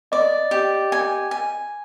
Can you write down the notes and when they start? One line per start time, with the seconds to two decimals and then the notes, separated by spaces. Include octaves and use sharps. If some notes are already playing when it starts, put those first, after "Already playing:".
0.12 D5 D#5
0.51 G4
0.92 G#5
1.31 G#5